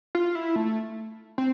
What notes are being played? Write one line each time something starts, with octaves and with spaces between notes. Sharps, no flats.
F4
E4
A3
C4